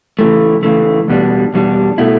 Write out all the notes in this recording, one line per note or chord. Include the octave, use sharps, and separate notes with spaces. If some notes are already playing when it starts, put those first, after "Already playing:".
C#3 E3 A3
C#3 E3 A3
E2 B2 G3 D4
E2 B2 G3 D4
B2 A3 E4